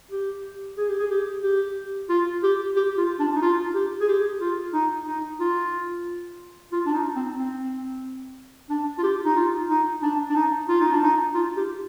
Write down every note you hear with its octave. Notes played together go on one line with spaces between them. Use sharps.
G4
G#4
G4
G#4
G4
G4
F4
G4
G4
F4
D4
D#4
F4
G4
G#4
G4
F4
D#4
D#4
F4
F4
D4
D#4
C4
C4
D4
F4
G4
D#4
F4
D#4
D4
D4
D#4
F4
D#4
D4
D#4
F4
G4